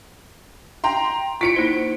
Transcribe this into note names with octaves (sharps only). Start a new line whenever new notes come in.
G5 A#5 C6
E4 F4 B6 C#7 D7
A#3 D#4 C5